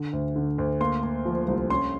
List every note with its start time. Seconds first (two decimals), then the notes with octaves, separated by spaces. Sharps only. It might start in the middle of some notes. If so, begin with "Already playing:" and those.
Already playing: D3
0.13 D2
0.36 D3
0.58 D2
0.80 A#3 C6
1.03 A#3
1.25 F3
1.48 C2
1.70 C#4 C6